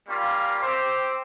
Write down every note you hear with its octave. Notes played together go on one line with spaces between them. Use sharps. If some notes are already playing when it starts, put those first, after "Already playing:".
G3 A#3 C#4 F4
C4 G4 C5